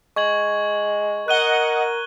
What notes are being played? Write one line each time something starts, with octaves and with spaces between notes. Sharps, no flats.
G#3 C#6 G#6 F#7
A#4 D#5 F#5 F#6 D#7 G7